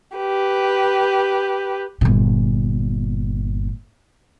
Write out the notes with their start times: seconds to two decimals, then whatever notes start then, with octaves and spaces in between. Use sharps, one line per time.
0.17 G4 B4
2.01 G1 A#2